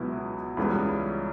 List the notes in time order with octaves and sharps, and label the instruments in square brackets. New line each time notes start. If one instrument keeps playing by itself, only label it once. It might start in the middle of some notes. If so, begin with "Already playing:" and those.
Already playing: [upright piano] C#2 B2 F#3 B3 E4
C#2 C#3 E3 G3 B3